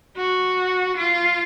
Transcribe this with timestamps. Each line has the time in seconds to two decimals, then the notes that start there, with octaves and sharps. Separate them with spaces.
0.17 F#4
0.98 F4